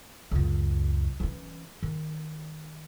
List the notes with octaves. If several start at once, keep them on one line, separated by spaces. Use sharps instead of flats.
C#2 F#2
E3 C#4
D#3